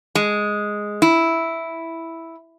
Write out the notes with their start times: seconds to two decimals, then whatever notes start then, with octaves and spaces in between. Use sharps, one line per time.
0.15 G#3
1.02 E4